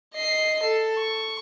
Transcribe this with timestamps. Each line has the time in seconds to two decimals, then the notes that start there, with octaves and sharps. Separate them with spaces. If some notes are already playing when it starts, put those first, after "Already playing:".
0.14 D#5 C7
0.63 A4
0.97 C#6